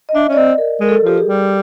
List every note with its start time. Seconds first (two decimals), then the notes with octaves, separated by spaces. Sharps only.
0.09 D#5
0.15 D4 E5
0.29 C#4
0.33 D5
0.36 C4 D#5
0.58 A#4
0.81 G#3 A#4
0.89 A4
1.03 F3 G4
1.18 G#4
1.25 G3